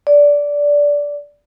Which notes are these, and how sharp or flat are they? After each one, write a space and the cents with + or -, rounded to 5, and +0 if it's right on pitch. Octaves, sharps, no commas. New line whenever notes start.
D5 -15